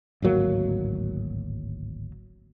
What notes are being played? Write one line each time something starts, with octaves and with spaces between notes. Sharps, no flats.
D1 G#1 F#3 A#3